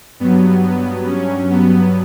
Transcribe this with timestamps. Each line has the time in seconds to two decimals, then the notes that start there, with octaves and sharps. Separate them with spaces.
0.20 G2 F#3 B3
0.64 B3
1.07 C#4
1.51 B3